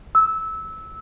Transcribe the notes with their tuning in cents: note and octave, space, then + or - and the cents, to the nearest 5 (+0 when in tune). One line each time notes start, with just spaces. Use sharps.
E6 -15